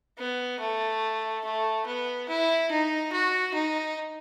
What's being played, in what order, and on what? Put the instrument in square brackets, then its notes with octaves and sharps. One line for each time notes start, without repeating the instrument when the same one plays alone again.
[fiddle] B3
A3
A3
B3
E4
D#4
F#4
D#4